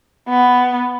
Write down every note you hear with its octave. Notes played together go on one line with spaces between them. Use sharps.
B3